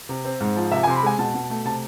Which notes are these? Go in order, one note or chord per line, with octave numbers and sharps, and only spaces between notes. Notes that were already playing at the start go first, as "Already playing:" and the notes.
C3
C4
G#2
F3
C3 E5
G#5
C3 C6
B5
G#3 G#5
B2 A5
B2
A3
C3 A5